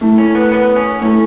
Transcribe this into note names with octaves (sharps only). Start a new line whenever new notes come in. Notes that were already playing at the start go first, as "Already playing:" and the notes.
A3 E4 A4
C#4
B3
B3
C#4
A3 C#4 E4 A4